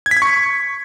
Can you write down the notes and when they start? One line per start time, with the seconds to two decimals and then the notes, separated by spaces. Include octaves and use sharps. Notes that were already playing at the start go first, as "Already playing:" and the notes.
0.06 G#6
0.11 B6
0.17 G#6
0.22 C#6